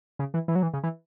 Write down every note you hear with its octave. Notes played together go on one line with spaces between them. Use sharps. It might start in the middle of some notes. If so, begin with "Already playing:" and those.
C#3
E3
E3
F#3
E3
C#3
E3